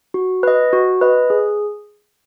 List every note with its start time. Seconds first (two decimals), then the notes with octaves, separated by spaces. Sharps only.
0.14 F#4
0.43 B4 D#5
0.73 F#4
1.01 B4 D#5
1.30 G#4